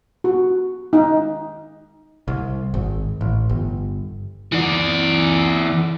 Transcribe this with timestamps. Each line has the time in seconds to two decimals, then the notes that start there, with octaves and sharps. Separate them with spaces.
0.24 F#4
0.93 D#4
2.28 C2
2.74 G#1
3.21 A1
3.49 G1
4.52 E3 D5